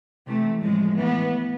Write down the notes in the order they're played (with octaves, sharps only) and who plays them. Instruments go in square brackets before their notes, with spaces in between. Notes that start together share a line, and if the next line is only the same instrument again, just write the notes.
[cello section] C3 E3 A3
A2 F3 G#3
A2 E3 B3